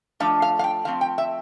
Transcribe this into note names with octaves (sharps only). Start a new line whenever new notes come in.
F3 A3 D4 F5
F5
F5
G5
F3 A3 C4 F5
G5
E5